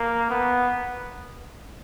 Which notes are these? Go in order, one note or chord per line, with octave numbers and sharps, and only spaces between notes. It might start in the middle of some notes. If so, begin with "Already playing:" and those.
Already playing: A#3
B3